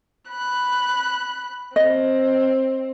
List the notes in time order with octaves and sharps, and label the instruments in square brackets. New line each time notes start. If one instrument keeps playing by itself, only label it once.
[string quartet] B5 F#6
[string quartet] C4 [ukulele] D#5